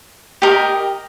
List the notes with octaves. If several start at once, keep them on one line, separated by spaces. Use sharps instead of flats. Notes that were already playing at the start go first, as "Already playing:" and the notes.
G4 A#4 D#5